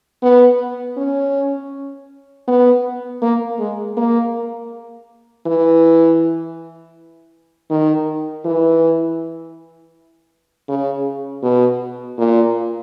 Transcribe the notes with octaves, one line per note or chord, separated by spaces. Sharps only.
B3
C#4
B3
A#3
G#3
A#3
E3
D#3
E3
C#3
B2
A#2